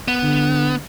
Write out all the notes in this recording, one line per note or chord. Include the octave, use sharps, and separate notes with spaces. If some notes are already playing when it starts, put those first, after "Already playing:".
B3
D3